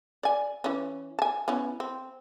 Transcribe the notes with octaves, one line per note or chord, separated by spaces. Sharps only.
D5 G#5
E3 C#4
G#5 A5
B3 C#4 E4
C4